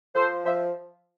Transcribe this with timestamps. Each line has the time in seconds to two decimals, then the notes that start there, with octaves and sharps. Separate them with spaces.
0.15 F3 A4 C5
0.45 F3 C5 E5